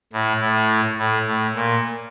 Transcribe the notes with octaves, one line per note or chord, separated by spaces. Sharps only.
A2
A2
A2
A2
A#2